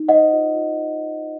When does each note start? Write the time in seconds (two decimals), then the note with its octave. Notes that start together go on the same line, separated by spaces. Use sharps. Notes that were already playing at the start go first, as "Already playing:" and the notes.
Already playing: D#4
0.08 C5 D#5 F#5
0.32 F4
0.55 F4